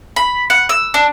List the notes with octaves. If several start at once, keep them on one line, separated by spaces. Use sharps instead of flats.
B5
F#5
E6
D4